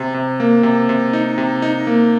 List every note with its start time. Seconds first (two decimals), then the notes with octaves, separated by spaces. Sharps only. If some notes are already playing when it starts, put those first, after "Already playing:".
Already playing: C3
0.14 C3
0.40 A#3
0.63 C3
0.89 C3
1.13 D#4
1.38 C3
1.62 D#4
1.87 A#3